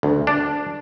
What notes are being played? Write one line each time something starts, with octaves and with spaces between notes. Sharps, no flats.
D2
D4